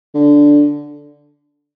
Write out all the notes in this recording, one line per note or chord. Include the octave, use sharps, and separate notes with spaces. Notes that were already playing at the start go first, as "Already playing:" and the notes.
D3